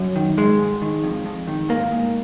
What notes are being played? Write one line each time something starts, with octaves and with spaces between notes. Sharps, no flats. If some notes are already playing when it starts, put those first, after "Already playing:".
Already playing: F#2
D#3
G#2 G#3
G#2
D#3
F2
F2
D#3
G#2 A#3
G#2